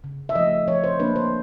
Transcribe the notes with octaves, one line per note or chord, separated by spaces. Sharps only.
C#3
E5
F3 A3 D#5
F3 C#5
C5
A#3 D4 B4
C5